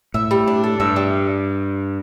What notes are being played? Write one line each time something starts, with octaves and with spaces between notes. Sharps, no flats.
A2 E5
G3
D4
A4
G2 E5
G3